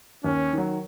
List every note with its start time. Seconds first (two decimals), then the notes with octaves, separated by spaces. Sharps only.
0.24 D#2 C#4
0.53 D#3 F#3